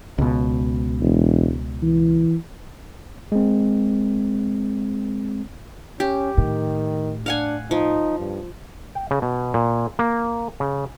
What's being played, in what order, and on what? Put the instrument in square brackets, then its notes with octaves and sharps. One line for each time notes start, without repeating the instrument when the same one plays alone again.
[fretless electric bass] C#2 B2
[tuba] E1
E3
[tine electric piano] G#3 C4
[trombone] C#4 [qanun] G4
[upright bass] A2 [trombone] D#3
[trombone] D4 [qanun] F5 F#5 G#5
[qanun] F3 [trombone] D#4
[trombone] G2
[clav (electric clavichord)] G5
C#3
B2
A#2
A#3
C#3